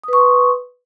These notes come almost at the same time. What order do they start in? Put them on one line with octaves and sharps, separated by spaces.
D#6 B4 C#6 C6